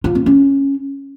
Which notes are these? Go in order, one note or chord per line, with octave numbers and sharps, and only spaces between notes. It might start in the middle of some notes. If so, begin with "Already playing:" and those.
F4
C4
C#4